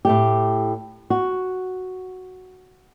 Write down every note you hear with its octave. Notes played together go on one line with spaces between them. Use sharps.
A2 A3 G4
F#4